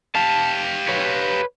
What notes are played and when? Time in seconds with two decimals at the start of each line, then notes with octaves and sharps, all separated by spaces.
0.15 G4 F5 A5
0.88 B4 C#5